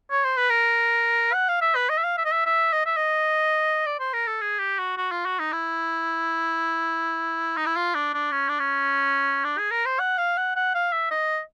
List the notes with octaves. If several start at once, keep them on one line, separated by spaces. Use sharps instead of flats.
C#5
C5
B4
A#4
F#5
F5
E5
B4
D#5
E5
F5
E5
D#5
E5
E5
D#5
E5
D#5
D5
C5
A#4
A4
G#4
G4
F#4
F#4
F4
F#4
D#4
E4
D#4
E4
F4
D4
D4
C#4
D4
C#4
D4
G#4
A#4
C5
F#5
F5
F#5
F#5
F5
E5
D#5